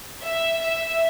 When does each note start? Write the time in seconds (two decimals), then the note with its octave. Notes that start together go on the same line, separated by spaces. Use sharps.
0.22 E5
0.59 E5